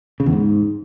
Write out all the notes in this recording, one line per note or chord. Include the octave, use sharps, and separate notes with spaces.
C#3
E2
G#2